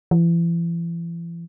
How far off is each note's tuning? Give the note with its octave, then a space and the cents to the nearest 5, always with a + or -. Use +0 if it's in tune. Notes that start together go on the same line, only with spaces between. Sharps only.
E3 +40